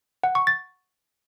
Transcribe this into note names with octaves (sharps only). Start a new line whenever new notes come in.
F#5
C#6
A6